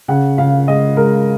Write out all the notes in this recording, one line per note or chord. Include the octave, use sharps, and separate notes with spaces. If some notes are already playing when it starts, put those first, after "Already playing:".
C#3 F#5
C#3 F5
G#3 D#5
G#3 A#4